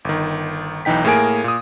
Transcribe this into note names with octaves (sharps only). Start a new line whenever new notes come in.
G1 D#3
B1 E3 D#4 G5 B6
A2 A#3 G#4 A#4 G#5 D7
A#2 D#6